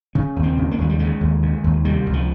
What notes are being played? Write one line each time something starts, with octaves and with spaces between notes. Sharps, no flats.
C#3 C#4
D#2
C4
C#3
A#3
D#2 G#3
G3
C#3 G#3
D#2
C#3
D#2
C3 G3
C#2
F3